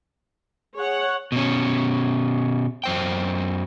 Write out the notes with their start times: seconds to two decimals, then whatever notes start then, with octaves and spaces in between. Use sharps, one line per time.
0.76 G#4 C#5 F#5
1.32 B2 C#4
2.84 F#2 C5 G5